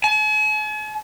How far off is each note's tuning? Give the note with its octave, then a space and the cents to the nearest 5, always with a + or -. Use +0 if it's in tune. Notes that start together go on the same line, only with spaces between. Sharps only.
G#5 +45